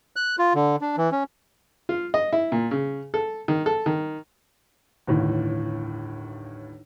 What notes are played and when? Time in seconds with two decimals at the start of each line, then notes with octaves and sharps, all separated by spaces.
0.16 F#6
0.39 F4
0.55 D3
0.81 D4
0.97 E3
1.12 C#4
1.89 F4
2.14 D#5
2.33 E4
2.52 A#2
2.71 C#3
3.14 A4
3.48 D#3
3.66 A4
3.86 D#3
5.07 G1 D#2 A2